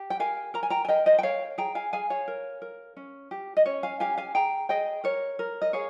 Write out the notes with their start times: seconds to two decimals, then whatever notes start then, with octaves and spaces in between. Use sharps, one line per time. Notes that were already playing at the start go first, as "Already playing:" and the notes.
Already playing: G4
0.10 G5
0.19 A#4 F5 G#5
0.54 A#4 A#5
0.63 G#5
0.70 G5 A#5
0.85 G#5
0.88 A#4 D#5 G5
1.06 C5 D#5
1.18 G5
1.23 A#4 C#5 F5
1.58 G#4 G5 A#5
1.75 F5 G#5
1.93 G#4 F5 G#5
2.10 C#5 F5
2.28 A#4
2.62 A#4
2.97 C#4
3.31 G4
3.57 D#5
3.66 C#4 C#5
3.83 F5 G#5
4.00 G4 F5 G#5
4.18 F5 G#5
4.35 G#4 G5 A#5
4.69 G#4 D#5 G5
5.04 A#4 C#5
5.39 A#4
5.62 D#5
5.73 G#4 C#5 F5